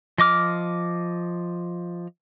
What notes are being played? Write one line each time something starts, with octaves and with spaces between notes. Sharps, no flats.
F3 D#5 D6 F6